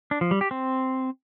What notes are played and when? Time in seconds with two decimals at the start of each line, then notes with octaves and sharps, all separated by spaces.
0.11 D4
0.21 F3
0.31 G3
0.41 G4
0.51 C4